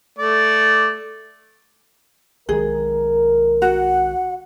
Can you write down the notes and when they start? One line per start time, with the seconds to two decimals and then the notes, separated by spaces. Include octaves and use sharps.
0.18 A3 D5
2.49 B1 D#3 G#3 G#4 A#4
3.62 F#4 F#5